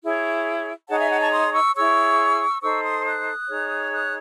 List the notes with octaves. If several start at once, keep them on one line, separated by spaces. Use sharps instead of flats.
E4 G#4 C#5
D#4 G#4 C#5 F#5 A5
E5 G#5
F#5 A5
A5 C#6
C6 D#6
C#6 E6
E4 G#4 C#5 C#6 E6
D#4 A4 C5 C#6 E6
C6 D#6
D#6 F#6
D#4 G#4 C#5
D#6 F#6